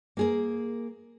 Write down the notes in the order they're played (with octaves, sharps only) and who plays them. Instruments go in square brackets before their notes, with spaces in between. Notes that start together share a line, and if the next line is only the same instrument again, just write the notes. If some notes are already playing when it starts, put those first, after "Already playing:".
[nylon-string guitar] A#3 G#4 A#4